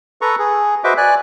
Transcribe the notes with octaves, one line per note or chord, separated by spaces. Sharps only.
A4 B4 A#5 C#6
G#4
F#4 B4 C5 D#5 E5 D6
D5 G#5 F#6